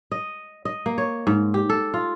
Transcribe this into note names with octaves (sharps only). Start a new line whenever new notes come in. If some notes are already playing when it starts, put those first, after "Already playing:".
D#5
D#5
A#3
C#5
G#2
G4
A4
F4